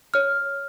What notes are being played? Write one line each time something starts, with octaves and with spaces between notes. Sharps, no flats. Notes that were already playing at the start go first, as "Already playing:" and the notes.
C#5 F6